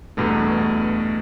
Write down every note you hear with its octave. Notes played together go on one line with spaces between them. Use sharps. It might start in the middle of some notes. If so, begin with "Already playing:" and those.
E2 G2 B2 A3